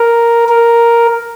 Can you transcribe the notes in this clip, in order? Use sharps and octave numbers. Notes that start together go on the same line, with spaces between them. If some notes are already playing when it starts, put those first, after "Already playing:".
Already playing: A#4
A#4